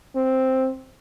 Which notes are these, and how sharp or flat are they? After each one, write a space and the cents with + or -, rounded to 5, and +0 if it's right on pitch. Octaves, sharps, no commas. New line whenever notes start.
C4 +0